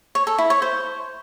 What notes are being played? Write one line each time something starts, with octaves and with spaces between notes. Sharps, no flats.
C#5
A4
E4
C#5
C5